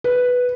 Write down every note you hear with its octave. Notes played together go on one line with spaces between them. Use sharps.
B4